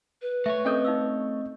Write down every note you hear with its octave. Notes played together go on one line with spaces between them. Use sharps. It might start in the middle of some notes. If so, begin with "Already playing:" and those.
B4
A3 C#5 E5
C4 C#4 A4 A#4 D#5 G6
D#4 F5 E6